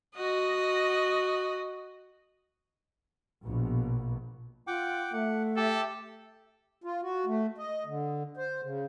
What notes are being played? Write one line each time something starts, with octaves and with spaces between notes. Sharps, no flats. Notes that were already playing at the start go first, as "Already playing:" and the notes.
F#4 D#5
A#1 B2
F4 F#5 G5 D6
A3 E5 F#5
G4 A4 G5
F4
F#4
A3
D#5
D3
C5
C#3